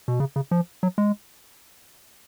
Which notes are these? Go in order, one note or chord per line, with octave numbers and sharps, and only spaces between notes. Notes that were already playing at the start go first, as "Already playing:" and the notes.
B2
C#3
C#3
F3
F#3
G#3